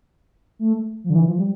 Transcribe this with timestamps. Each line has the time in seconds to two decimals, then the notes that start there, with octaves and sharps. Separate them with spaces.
0.59 A3
1.04 F3
1.10 D3
1.15 E3
1.27 F3
1.38 G3